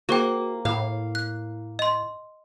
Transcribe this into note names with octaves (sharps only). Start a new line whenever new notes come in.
A#3 F#4 G#4 C5 G5
A2 F5
F#6
D#5 C6